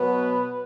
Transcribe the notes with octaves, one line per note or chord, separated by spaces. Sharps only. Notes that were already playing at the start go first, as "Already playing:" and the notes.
Already playing: B2 F#3 B3 B4